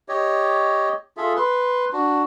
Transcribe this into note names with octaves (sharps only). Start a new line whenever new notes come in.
G4 C#5 D#5
F4 G#4 A4 E5
B4 C6
D4 F#4